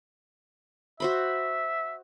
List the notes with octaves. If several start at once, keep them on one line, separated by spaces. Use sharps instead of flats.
F#4 C5 E5 B5